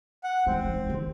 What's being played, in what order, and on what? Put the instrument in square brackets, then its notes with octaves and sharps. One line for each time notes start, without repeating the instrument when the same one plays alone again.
[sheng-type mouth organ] F#5
[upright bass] G#3 [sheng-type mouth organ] C4
[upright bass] F3 D#4
D#3